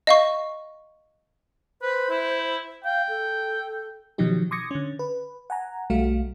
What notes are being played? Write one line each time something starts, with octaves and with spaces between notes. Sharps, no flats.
D#5 F5 C#6
B4 C5
E4
F5 G5
A4
B2 D#3 F3 F#3 D#4 G4
C6 D6 D#6 G#6 A#6 C#7
D3 C#4
B4
F#5 G#5 A#5
B1 G3 A3 F#4 F5